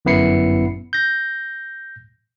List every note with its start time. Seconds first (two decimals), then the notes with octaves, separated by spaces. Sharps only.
0.05 G1 F#2 B3 E4 C7 C#7
0.93 G6 A#6